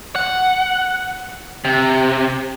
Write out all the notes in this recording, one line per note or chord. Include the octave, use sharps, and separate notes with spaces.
F#5
C3